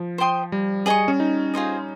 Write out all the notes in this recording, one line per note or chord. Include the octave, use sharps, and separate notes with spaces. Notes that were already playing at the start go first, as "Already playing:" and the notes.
Already playing: F3
C5 G5 C6 D#6
G3
G#4 D#5 G#5 C#6
C#4
D#4
F4 G#4 C5 D#5